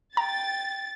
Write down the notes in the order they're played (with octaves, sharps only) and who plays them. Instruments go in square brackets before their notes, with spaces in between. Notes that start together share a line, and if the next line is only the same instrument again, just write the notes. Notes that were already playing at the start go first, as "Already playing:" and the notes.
[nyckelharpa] G5 [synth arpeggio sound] A#5 [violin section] A6